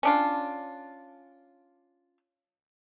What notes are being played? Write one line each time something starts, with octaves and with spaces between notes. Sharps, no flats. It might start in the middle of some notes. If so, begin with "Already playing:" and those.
C#4 D4 F4